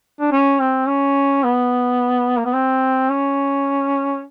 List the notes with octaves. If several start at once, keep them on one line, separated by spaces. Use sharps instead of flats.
D4
C#4
C4
C#4
B3
A#3
B3
C4
C#4